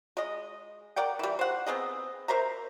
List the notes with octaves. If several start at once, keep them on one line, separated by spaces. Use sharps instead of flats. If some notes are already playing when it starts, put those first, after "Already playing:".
G#3 D#5
A#4 D5 F#5 G5
E3 G3
C5 F#5
B3 C4 G#4 D#5
A#4 C5 E5 A#5